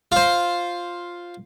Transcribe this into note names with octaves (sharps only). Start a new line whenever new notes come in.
F4 C5